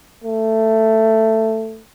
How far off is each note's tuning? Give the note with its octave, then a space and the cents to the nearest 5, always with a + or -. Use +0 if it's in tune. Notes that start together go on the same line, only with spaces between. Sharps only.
A3 +10